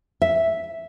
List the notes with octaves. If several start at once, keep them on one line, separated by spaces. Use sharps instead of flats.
E5